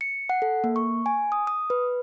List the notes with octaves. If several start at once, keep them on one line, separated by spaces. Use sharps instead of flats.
C#7
F#5
A4
A#3
C#6
G#5
D#6
D#6
B4